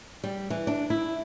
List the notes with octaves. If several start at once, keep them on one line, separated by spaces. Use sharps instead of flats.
G3
E3
D4
E4